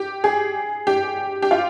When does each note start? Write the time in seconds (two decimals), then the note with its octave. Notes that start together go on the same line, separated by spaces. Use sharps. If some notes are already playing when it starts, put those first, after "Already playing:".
Already playing: G4
0.24 G#4
0.87 G4
1.42 G4
1.51 F4